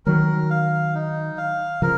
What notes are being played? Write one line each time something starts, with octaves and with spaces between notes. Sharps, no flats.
D#3 F#3 A#4
F5
D#4
F5
C#3 F3 A#4